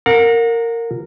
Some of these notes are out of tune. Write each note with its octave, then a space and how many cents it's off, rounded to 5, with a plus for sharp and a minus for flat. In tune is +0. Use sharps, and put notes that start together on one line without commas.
A#4 -15 F#5 -40